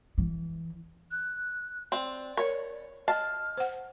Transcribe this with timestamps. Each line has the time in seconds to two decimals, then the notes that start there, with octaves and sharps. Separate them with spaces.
0.18 E3
1.11 F#6
1.92 C4 D5
2.37 A#4 C#5
3.08 D#5 A5 F6
3.57 C5 F#5